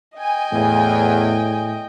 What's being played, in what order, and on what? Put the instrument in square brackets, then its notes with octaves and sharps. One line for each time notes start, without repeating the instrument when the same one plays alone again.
[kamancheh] D#5 G5 [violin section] G#5
[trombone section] E2 [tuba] A2